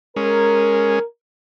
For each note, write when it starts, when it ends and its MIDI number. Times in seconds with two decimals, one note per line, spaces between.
0.16 0.99 56
0.16 0.99 61
0.16 1.03 70